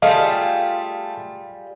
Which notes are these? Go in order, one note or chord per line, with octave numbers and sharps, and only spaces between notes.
G3 A3 F4 G#4 D#5 F5